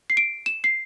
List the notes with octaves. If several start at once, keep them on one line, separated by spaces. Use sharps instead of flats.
C7
D7
E7
C7